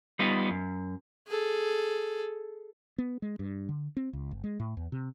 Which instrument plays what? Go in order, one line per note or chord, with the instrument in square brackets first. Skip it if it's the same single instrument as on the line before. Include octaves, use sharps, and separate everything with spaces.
[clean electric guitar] G3 B3 D#4 F4
F#2
[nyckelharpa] G#4 A4
[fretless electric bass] B3
G#3
G2
D3
C4
C#2
G1
G#3
A2
E2
C3